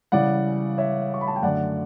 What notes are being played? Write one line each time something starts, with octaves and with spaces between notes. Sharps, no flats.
C#3 E3 G3 D5 F#5
C#5 E5
C#6
B5
A5
G5
F#2 D3 A3 D5 F#5